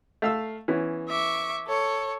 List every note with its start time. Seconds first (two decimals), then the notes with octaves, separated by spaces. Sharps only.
0.22 A3 F5 E6
0.68 E3 B3 C#4
1.09 E5 C#6 D6
1.67 A4 C#5